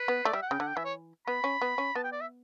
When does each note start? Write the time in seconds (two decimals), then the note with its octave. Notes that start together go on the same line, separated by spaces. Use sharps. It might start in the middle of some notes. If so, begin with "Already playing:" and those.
Already playing: B4
0.08 B3
0.25 A3 D5
0.33 G3 E5
0.42 F#5
0.50 C#3 G5
0.59 D3 F#5
0.67 G5
0.76 E3 E5
0.84 C#5
1.27 B3 B5
1.44 C#4
1.62 B3
1.78 C#4
1.95 B3 A5
2.04 G5
2.12 D5
2.21 E5